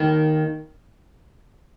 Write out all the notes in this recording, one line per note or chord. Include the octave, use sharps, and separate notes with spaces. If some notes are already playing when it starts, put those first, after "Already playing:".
Already playing: D#2 D#3